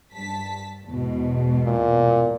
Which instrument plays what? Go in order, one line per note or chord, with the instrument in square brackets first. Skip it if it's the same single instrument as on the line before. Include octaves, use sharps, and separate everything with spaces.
[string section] G2 A5 B6
E2 G#2 B2
[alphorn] A#2